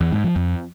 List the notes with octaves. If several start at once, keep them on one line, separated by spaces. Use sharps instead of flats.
E2
G#2
F3
F2